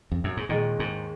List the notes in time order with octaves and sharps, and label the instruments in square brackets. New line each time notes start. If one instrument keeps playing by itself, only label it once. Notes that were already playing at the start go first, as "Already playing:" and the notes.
[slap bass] F2
F#2
G#2
[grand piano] D#2 D#3 G#3 [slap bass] A#2
[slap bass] G#2